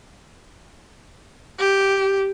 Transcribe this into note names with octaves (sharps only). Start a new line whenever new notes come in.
G4